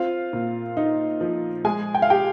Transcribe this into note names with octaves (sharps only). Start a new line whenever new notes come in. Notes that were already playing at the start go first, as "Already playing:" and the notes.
Already playing: C4 F4 F5
A#2
D#4
F3
G#3 G#4 G#5
G5
F5
G4 G5